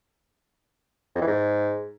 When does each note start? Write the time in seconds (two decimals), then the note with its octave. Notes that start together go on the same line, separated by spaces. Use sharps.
1.15 F2
1.21 E3
1.27 G#2